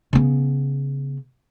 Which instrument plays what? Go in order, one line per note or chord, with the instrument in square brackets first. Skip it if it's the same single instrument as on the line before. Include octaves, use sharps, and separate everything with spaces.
[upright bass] C#3 B3